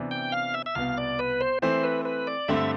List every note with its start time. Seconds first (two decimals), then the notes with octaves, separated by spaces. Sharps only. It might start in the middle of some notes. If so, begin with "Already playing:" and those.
Already playing: C3 E3 B3 D4
0.11 G5
0.32 F5
0.54 E5
0.66 E5
0.75 C2 B2 B3 F5
0.98 D5
1.19 B4
1.41 C5
1.62 E3 A3 C4 E4 C5
1.84 B4
2.05 B4
2.27 D5
2.48 G2 D3 A3 C4 E5